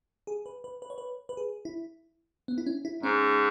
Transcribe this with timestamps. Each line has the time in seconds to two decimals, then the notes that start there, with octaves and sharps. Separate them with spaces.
0.27 G#4
0.46 B4
0.64 B4
0.82 B4
0.90 C#5
0.98 B4
1.29 B4
1.37 G#4
1.65 E4
2.48 B3
2.58 E4
2.66 C#4
2.85 E4
3.03 G#2 C#4